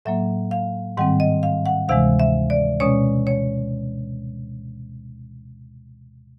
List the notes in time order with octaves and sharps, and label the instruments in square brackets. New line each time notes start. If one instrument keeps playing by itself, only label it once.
[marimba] A2 F#3 A#3 E5
F5
G#2 D#3 G3 C4 F#5
D#5
F5
F#5
D2 C3 E3 G#3 F5
E5
D5
B2 G#3 C#4 C#5
C#5